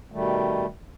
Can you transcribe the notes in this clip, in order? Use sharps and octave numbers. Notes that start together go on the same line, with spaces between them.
B2 D#3 G3 A3